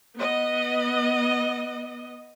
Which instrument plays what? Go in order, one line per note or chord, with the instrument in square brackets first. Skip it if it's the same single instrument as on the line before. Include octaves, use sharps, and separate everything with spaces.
[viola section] B3 D#5